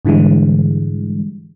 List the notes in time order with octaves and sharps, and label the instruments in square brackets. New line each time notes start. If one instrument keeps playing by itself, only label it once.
[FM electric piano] G#2 D3 E3 G3 G#3